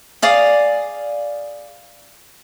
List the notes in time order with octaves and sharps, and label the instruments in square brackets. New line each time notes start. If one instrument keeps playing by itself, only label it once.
[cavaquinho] G#4 D5 F5 D#6